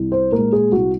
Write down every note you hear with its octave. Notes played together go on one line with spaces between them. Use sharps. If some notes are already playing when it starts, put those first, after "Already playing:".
Already playing: C2
C5
A#2 G#3 A#4
G#4
C2 F#4